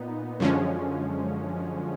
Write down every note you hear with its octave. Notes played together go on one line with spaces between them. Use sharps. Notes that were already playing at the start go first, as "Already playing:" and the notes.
Already playing: A#2 B3 D#4
F#2 D3 F3 G#3 C#4